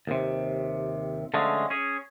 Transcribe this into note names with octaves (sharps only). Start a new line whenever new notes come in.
D#2 C3
D3 F3 G#3 A3 C#4
C#4 G#4